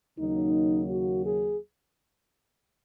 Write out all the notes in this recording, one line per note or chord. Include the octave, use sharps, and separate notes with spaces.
D#2 C#3 F#3 A#3 D#4
F#4
G#4